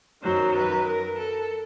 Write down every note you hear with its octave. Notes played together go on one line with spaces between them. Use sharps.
F#2 D#3 F#3 C5
B4
A#4
A4